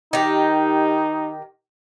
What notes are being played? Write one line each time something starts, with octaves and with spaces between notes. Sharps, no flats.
D#3 D#4 G4